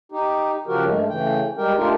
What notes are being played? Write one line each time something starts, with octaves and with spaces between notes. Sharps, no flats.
D#4 G4
C#3 F3 F#4 G4 A#4
G2 G#3 A3
C#3 E3 A3 G5
G3 G#3 G4 A#4 G5
A3 D4 D#4 F4 G4 A#4